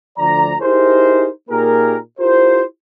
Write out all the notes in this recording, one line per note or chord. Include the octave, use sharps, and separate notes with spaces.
D2 D3 F3 D5 A#5
D#4 E4 G4 G#4 A#4 C5
A#2 A#3 D#4 G4 G#4 A#4
E4 F4 G4 A#4 C5